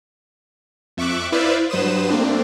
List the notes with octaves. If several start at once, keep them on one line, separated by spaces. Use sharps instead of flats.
F2 E5 C#6 D6 F#6
E4 B4 C5 D5 E5 F5
G2 F#3 B4 C5 D#6 E7
A3 A#3 C4 D4